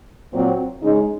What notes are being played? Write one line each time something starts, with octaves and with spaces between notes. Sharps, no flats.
A#2 F#3 C4
C#3 G#3 D#4